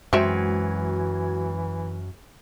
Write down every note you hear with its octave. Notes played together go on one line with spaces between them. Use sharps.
F#2 E3 G#3 C4 F#4 C5 E5 G#6